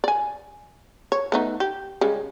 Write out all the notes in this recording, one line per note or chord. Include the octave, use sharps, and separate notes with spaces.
D5 G#5
C#5
A3 B3 D#4
G4
C#3 G3 G#3